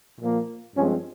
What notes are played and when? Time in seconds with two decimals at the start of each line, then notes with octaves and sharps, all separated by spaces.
0.20 A#2 F3 A#3
0.76 G2 F3 G#3 C4 C#4